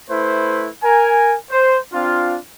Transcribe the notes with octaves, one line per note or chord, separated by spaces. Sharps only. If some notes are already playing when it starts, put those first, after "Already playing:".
A3 E4 B4 C5
A#4 G#5
C5
C4 D4 F4